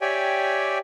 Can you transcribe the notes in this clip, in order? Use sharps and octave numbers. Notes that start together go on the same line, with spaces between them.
G4 C#5 D5 E5 G5 G#5